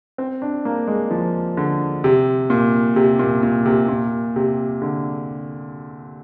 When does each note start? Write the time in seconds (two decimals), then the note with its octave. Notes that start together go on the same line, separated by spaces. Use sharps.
0.18 C4
0.42 D4
0.65 A#3
0.87 G#3
1.10 F3
1.57 D3
2.04 C3
2.50 A#2
2.96 C3
3.19 A#2
3.43 A#2
3.65 C3
3.88 A#2
4.36 C3
4.82 D3